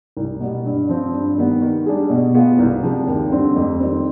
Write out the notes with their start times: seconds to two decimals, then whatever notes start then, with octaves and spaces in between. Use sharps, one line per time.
0.17 C2
0.40 B2 G3 B3
0.65 G2
0.89 F3 C4
1.13 G2
1.38 D#3 G3 B3
1.62 D#3
1.86 G3 D4 G#4
2.10 B2
2.34 B3 F4 G#4
2.59 C2
2.83 C3 F3 G#3
3.07 D#2
3.31 D3 G3 C4
3.56 F2
3.80 D#3 G3 C4